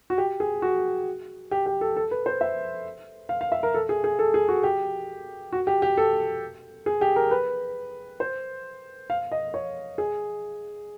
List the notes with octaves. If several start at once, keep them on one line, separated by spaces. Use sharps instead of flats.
F#4
G4
G#4
F#4
G4
G4
A4
A4
B4
C5
E5
F5
F5
E5
A#4
A4
G#4
G#4
A4
G#4
F#4
G4
F#4
G4
G4
A4
G#4
G4
A#4
B4
C5
F5
D#5
C#5
G#4